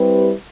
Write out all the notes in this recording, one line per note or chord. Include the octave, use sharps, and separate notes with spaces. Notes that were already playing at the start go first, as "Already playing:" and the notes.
Already playing: G3 C4 E4 G4 B4